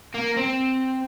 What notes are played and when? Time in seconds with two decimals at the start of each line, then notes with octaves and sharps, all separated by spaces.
0.14 A#3
0.37 C4